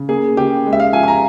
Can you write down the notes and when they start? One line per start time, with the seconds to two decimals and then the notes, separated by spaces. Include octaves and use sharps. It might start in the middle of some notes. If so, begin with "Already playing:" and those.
Already playing: C#3
0.09 A#3 G#4
0.37 C#3 G4
0.66 G#3
0.73 E5
0.80 F5
0.93 F3 G#5
1.03 G#5
1.08 A#5